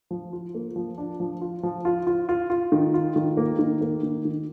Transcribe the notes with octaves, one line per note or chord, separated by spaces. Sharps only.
F3
F4
A#3
F3
D4
F3
F4
F3
F4
F4
F4
F4
D#3
F4
D#3
A#3
D#3
A#3
D#3
D#3